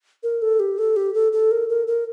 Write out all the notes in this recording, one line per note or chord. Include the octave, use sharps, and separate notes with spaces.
A#4
A4
G4
A4
G4
A4
A4
A#4
A#4
A#4